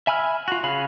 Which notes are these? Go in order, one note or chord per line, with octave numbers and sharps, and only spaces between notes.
E5 G#5 B5 E6 F6
F4 F#4
C#3 C#4 G#4 F5 B5